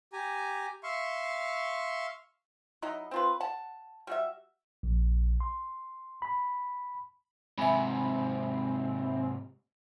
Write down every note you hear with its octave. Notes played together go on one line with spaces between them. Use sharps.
G4 G#5 A#5
E5 F5 C6 C#6
F#3 D#4 E4 D#5
C4 F4 B4
F#5 A5
G3 F#4 E5
A#1
C6
B5
G#2 C3 C4 E5 G#5 B5